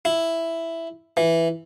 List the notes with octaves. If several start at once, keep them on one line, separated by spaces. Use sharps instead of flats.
E4
E3